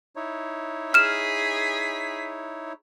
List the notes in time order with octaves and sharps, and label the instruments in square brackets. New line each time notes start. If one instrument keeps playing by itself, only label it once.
[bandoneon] D#4 E4 C#5
[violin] G#4 B6 [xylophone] F6 E7